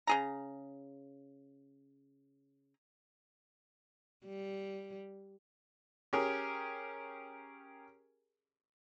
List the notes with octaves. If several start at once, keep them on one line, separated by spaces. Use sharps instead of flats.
C#3 G#4 A#5
G3
C#4 G4 G#4 A#4